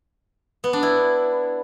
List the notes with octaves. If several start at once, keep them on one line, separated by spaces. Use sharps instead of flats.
B3
D4
E4